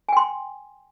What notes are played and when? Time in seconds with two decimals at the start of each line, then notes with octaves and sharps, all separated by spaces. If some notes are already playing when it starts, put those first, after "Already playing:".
0.09 G#5
0.13 G5
0.17 C6